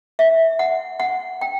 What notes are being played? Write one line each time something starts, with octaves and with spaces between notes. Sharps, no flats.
E5
F#5
F#5
G5